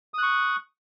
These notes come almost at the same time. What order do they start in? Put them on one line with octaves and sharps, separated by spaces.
D#6 F#6 C#6